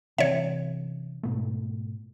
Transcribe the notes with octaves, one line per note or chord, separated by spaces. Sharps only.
C3 E3 C#4 C#5 E5
G#2 B2 A3